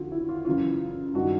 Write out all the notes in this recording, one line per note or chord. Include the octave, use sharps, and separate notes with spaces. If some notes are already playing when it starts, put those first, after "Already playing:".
Already playing: F2 D3 F4 F#4
E4
F4
F#2 C#3 E3 F4
G2 D#3 F#4